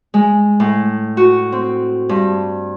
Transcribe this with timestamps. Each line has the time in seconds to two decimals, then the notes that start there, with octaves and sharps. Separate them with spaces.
0.14 G#3
0.60 A2
1.17 F#4
1.52 C4
2.09 G2